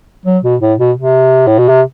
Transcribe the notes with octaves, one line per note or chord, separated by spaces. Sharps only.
F#3
B2
A2
B2
C3
A2
B2
C3